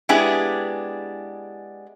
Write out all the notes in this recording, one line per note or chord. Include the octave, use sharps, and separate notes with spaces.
G#3 B3 D4 E4 G4 G#4